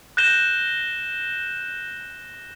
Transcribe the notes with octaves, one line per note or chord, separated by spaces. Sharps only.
F#6 G6 A#6 E7 G7